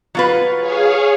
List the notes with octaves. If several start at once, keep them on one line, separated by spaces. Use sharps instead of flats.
F#3 F4 B4
G#4 C#5 F5